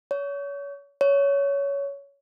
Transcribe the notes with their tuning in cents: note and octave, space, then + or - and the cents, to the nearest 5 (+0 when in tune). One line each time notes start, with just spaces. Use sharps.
C#5 +30
C#5 +15